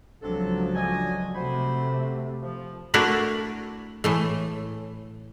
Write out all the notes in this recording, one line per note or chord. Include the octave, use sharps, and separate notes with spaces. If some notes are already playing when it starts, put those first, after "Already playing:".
C#2 C3 F3 F#3 D4 A4
D4 D#5 G#5
C3 A3 F#4 C5 B5
F3
A3 D4 E4 F#4 A#4 B4
A2 E3 A3